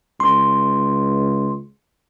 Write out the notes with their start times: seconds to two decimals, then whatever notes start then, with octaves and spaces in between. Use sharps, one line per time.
0.20 C#2 C6